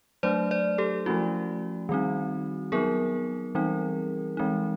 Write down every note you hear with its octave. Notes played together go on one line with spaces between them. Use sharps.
F#3 A3 D4 C5 D5
C5 D5
G4 A4
F3 A3 C#4 E4 F#4
D#3 G3 C4 D#4
F#3 B3 D#4 G#4 A#4
E3 G3 C4 D#4
E3 G#3 C4 D#4